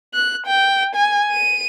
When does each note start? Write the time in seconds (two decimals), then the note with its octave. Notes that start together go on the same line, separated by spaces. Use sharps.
0.14 F#6
0.46 G5
0.95 G#5
1.31 D#7